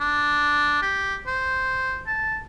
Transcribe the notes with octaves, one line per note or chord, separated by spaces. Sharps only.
D4
G4
C5
A5